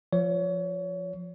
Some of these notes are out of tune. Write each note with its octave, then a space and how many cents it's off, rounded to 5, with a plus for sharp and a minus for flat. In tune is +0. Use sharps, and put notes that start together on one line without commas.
F3 +0 C#5 +30